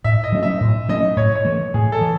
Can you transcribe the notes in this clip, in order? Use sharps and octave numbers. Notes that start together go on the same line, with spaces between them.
A2 E5
D#5
F#3 A3 C#4
E5
A2
F#3 A3 C#4 D#5
A2 C#5
C#5
E3 A3
A2 G#4
A4
E3